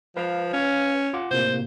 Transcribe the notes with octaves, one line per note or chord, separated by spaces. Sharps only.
F3 B4 F5
C#4
F4 F#5 D6
A2 C3 A#3 C5